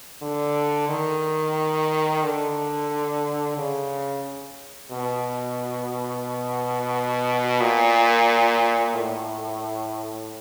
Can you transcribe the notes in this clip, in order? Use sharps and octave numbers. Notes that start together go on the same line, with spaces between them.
D3
D#3
D3
C#3
B2
A#2
A2